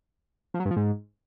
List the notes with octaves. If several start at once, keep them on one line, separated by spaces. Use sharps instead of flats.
F3
F#3
G2
F3
G#2